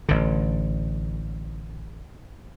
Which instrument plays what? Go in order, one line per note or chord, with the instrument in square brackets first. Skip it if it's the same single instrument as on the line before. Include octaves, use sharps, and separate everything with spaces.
[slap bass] A1 D3